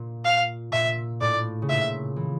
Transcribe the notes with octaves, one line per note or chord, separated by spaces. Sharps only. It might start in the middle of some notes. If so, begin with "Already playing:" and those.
Already playing: A#2
F5
A#2 E5
A2 D5
C#3
A#2 E5
E3